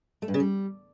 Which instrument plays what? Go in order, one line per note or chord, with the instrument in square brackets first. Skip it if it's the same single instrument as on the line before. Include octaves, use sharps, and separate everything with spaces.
[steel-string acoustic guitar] A3
G2
C#3
G3